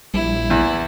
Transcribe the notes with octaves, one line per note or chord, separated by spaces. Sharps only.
A#1 G3 E4
E2